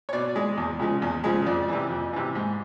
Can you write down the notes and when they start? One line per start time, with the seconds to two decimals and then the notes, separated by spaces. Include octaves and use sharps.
0.09 C#5
0.13 B2 D5
0.36 G#3
0.57 E2
0.79 C#3 F3 G#3
1.02 E2
1.24 C#3 F3 G#3
1.46 F2 D5
1.68 C3 E3
1.90 F2
2.13 C3 E3
2.35 G#2